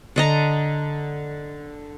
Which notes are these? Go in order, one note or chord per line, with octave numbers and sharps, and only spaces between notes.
D3 D#5 A#5